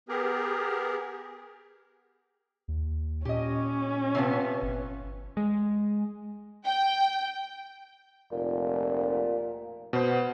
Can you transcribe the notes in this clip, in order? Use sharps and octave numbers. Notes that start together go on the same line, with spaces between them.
B3 G4 G#4 A#4
D#2
A#2 C#4 G4 D#5
C3 F3 B3
G1
G#3
G5
F1 A#2
B2 B3 C5